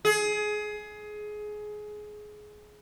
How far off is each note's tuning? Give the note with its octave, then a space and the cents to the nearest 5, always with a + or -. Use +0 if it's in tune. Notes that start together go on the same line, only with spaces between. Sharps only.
G#4 +20